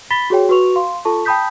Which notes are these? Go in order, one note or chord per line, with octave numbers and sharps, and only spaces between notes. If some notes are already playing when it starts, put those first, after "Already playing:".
B5 A6 B6 G7
F#4 G#4 C#5 G5
F#4 B4 C#6 F7
F5 C6
F4 A4 A5 C#6
G5 A5 B5 D#6 G6 B6